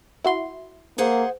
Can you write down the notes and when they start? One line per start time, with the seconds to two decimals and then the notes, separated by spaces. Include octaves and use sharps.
0.24 E4 F#4 C6
0.98 A#3 G#4 C5 F#5